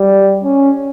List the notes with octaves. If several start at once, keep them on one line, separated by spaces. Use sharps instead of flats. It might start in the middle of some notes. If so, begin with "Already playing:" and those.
Already playing: G3
C#4